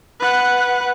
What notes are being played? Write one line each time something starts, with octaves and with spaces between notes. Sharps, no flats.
B4 F#5